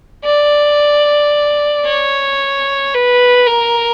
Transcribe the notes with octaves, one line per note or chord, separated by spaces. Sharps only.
D5
C#5
B4
A#4